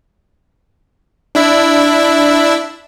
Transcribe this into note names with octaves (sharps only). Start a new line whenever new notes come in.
D4 E4 E5